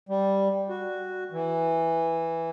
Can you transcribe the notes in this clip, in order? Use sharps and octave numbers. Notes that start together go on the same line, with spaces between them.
G3
F#4
E3